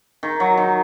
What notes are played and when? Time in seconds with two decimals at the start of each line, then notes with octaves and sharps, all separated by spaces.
0.23 D#3
0.40 F#3
0.58 D#3